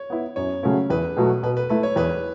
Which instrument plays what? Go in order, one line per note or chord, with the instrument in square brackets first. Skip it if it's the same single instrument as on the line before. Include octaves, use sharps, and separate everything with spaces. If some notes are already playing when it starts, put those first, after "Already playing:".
Already playing: [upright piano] C#5
[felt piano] B3 E4
[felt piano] F#2 [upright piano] C#5
[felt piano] C#3 F#3 A3 C#4
[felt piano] E2 [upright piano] B4
[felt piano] B2 F#3 A3
[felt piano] B2 [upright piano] B4
[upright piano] B4
[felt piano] A3 E4 [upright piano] B4
[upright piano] C#5
[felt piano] E2 [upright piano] B4